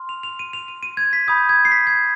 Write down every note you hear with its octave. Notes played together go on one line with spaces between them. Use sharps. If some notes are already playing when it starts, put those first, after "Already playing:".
Already playing: C6 F6
F7
F7
D#7
F7
D#7
D#7
G#6
B6
B5 D#6 G6 G#6
G#6
C7
B6
G#6